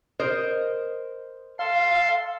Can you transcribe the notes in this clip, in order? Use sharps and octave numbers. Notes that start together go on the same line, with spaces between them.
A#4 C5 D#5
A4 F5 C6